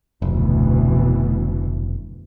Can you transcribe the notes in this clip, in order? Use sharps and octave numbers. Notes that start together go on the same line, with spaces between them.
F1 D2 B2 E3